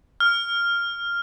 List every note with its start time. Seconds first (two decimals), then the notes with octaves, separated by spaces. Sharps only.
0.20 F6